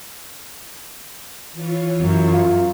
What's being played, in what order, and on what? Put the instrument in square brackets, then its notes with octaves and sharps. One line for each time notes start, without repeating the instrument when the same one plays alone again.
[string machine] E3 F4 C#5
[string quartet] F#2
[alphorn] F4